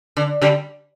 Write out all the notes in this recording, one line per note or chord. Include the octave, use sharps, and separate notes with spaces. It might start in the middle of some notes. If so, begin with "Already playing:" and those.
D3
D3 G3